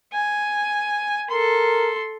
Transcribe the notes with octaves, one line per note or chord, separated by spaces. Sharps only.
G#5
A4 A#4 C6